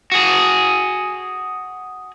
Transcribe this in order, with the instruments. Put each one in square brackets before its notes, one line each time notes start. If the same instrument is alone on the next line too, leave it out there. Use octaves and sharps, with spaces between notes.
[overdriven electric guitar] F#4 G#4